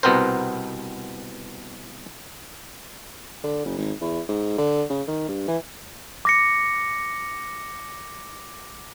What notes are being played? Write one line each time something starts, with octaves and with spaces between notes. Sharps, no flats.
C2 B2 B3 C4 A#4 C5
D3
F#1
G#1
E2
G#2
D3
C#3
D#3
G2
E3
D6 A#6 C#7